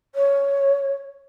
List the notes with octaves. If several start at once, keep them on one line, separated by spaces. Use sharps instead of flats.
C#5